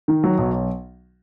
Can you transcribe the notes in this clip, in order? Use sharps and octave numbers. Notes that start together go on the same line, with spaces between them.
D#3
F#3
B1